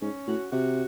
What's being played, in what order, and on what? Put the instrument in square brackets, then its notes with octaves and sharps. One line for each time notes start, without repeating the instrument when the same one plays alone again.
[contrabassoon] G#2 [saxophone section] C#4
[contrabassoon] A2 [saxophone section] F#4
[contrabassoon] C3 [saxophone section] F#4